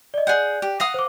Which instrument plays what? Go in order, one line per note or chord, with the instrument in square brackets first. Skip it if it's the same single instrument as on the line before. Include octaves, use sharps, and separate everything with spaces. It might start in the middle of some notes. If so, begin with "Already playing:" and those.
[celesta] D5 D#5
[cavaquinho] G#4 F#5 [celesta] D5 F#6 G6
[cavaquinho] G4
[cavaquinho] F5 F#5 D#6 [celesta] A#6
[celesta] C5 D6